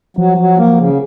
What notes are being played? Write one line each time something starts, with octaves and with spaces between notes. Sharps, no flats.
F3 F#3
F#3
A#3
C#3